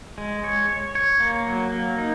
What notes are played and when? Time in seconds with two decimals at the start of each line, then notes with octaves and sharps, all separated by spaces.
0.18 G#3
0.44 C#5
0.69 C#5
0.95 C#5
1.20 A#3
1.46 F#3
1.72 A#3
1.98 D#4